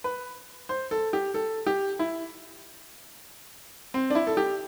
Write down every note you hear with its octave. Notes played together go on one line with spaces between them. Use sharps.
B4
C5
A4
G4
A4
G4
E4
C4
D4
E4
A4
G4